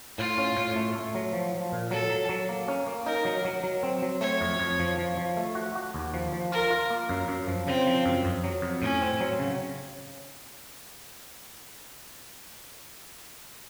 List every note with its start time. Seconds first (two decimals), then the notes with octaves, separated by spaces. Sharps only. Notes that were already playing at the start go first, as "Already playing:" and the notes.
0.18 A2 F4
0.38 C#4
0.57 A2
0.76 A3
0.95 A3
1.15 F#3
1.33 F3
1.53 F3
1.72 A#2
1.91 F#3 A4
2.10 F#3
2.29 F#3
2.49 A#3
2.68 C#4
2.87 A#3
3.06 D#4 A#4
3.25 F#3
3.45 F#3
3.63 F#3
3.83 C4
4.02 F#3
4.21 A3 C#5
4.41 F2
4.59 F2
4.79 F3
4.98 F3
5.17 F3
5.37 A3
5.55 F#4
5.75 F#4
5.94 D#2
6.14 F3
6.32 F3
6.52 F4 A#4
6.70 F4
6.90 A#3
7.09 F#2
7.28 F#2
7.47 F3
7.67 C#3 C4
7.86 F3
8.06 F#2
8.25 F2
8.44 F#3
8.62 F2
8.82 A2 C#4
9.01 C4
9.20 F#3
9.39 C#3